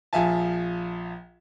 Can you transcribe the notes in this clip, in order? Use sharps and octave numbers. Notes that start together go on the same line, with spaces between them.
A#1 F3 E5 F5 G#5 A5